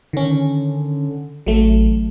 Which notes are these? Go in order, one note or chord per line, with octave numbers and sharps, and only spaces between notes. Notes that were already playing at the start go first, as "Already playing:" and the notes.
D3 D#3 C#4
A1 F#3 A3